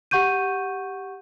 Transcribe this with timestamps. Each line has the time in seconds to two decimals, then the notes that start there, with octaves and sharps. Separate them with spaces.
0.11 G4 F#5 C#6 G6 D#7